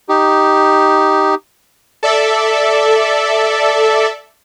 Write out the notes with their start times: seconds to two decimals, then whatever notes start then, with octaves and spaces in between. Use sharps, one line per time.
0.09 D#4 G4
2.03 A4 D5 E5